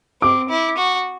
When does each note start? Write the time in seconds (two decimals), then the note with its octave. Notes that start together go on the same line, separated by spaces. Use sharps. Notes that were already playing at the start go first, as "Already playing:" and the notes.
0.21 C4 D6
0.49 E4
0.78 F#4